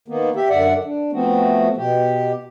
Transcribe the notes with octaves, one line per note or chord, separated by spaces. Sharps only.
D#3 A#3 B3
G4 E5
F#2 D3 D5 E5 F#5
D4
F3 A3 B3 C4 F#4
B2 G4